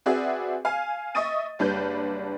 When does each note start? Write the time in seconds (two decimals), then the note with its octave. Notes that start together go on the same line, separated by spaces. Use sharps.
0.06 C4 F#4 G#4 B4 D5 E5
0.65 F5 G#5
1.15 D#5 E5 C#6 D#6 A6 D#7
1.59 F#1 G3 D4 B4 G6